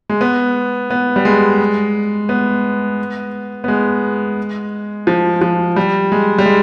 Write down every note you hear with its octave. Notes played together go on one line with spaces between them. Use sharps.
G#3
B3
B3
G3
G#3
B3
B3
G#3
F3
F3
G3
G#3
G3
G#3